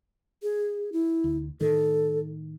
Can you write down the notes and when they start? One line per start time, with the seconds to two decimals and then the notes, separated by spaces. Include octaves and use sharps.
0.43 G#4
0.92 E4
1.24 D2
1.61 A2 D#3 A4